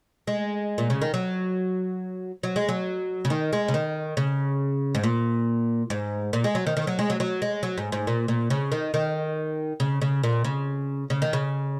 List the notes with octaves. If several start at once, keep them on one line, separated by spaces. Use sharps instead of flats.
G#3
A#2
C#3
D#3
F#3
F#3
G#3
F#3
C#3
D#3
G#3
C#3
D#3
C#3
G#2
A#2
G#2
A#2
G#3
F#3
D#3
D#3
F#3
G#3
F#3
F#3
G#3
F#3
G#2
G#2
A#2
A#2
C#3
D#3
D#3
C#3
C#3
A#2
C#3
C#3
D#3
C#3